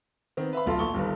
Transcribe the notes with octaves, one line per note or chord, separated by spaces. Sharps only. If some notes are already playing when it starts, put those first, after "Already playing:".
D#3 B3 C4
B4 E5 F5 B5
D1 B1 F4 A4 C6
A#1 A5 C#6 G7
G1 G2 D#3 B4